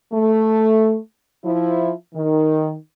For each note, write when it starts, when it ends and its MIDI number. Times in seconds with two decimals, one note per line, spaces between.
0.12 0.97 57
1.45 1.92 53
1.45 1.92 64
2.14 2.73 51